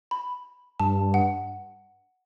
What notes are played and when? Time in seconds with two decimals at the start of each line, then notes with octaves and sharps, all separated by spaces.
0.11 B5
0.80 G2 A5
1.14 F#5